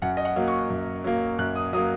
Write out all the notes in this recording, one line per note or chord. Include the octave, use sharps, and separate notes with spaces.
F#2 F#5
D#5
F#5
F#3 A#3
C#6
F#2
F#3 A#3
F#2 F#6
D#6
F#3 A#3 D#6